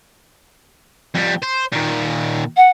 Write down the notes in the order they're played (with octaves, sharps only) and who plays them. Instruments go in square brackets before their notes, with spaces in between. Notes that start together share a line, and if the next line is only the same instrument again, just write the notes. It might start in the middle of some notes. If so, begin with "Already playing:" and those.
[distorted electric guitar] F2 G3
C5
A#2 D#3
[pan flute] F#5